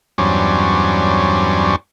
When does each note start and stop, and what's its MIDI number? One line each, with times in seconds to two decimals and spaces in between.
0.18 1.76 40
0.18 1.76 43
0.18 1.76 54
0.18 1.76 61
0.18 1.76 72
0.18 1.76 74